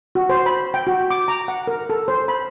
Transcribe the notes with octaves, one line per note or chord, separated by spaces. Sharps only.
F#4
C5
B5
G5
F#4
D6
A#5
F#5
A#4
A4
C5
B5